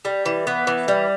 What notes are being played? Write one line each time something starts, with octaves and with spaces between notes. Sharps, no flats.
G3
E3
B3
E3
G3